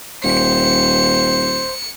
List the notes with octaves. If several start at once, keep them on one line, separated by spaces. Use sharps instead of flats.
D#1 C5 C#7